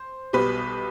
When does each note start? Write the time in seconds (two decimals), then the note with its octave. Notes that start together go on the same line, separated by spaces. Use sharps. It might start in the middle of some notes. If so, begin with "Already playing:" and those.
Already playing: C5
0.33 B1 B2 G3 G4 B4